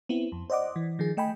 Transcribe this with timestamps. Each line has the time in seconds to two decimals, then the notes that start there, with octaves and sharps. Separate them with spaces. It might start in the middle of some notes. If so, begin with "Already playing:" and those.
0.09 B3 C4 E4
0.32 F2
0.50 C5 D5 D#5 F#5 D6
0.76 E3
0.99 D#3 F3 G#4
1.17 A3 D#5 G5 G#5 B5